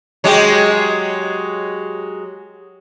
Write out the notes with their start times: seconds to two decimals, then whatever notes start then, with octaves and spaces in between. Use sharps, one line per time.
0.24 F#3 G#3 G4